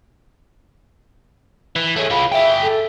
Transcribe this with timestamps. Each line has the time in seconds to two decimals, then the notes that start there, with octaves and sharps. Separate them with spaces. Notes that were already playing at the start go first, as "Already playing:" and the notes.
1.76 E3
1.96 G#3 A3 C#5
2.10 G#3 F4 B5
2.32 G#4 E5 G5
2.62 A4